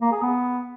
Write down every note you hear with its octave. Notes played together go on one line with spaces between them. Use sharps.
A#3
G#4
B3